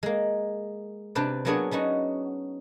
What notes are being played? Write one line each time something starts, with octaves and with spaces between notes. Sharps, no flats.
G#3 A#3
C3 D4 G4 B4 C5 D5
F#3 A#3 B3 D4 G#4 C#5
B3 C#4 D#4 F#4